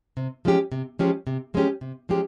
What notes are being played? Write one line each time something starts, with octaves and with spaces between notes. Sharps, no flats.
C3
F3 G#3 C#4 G4
C3
F3 G#3 C#4 G4
C3
F3 G#3 C#4 G4
C3
F3 G#3 C#4 G4